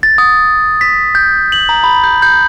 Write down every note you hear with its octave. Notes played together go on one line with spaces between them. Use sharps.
A6
D#6
B6
G6
F#7
A#5
B5
G6
G6